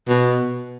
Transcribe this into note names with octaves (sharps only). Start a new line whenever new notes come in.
B2